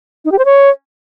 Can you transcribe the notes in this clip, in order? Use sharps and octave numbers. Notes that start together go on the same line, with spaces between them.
D#4
G4
C5
C#5